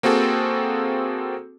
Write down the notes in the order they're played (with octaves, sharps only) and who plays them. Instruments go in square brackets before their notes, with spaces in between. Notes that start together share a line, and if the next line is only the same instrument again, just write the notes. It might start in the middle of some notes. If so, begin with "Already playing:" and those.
[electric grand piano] A#3 C4 F#4 G#4 A4